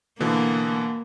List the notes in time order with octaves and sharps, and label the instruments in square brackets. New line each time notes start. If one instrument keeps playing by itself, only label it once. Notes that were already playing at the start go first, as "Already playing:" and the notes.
[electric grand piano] B2 D3 E3 [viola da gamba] A#3